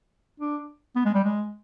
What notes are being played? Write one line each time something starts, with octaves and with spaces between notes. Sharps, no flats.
D4
B3
G#3
G3
G#3